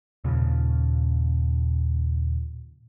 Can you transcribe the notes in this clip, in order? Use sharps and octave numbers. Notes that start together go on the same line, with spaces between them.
D#2 A#2 C#3 F3